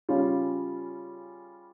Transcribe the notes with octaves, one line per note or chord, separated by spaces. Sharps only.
C#3 G3 C#4 F4